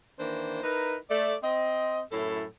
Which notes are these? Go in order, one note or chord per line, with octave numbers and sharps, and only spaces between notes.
D#3 E3 A#3 D4 C5
D#4 E4 A#4 B4
A3 D5
C4 D#5
F#2 A2 E4 A4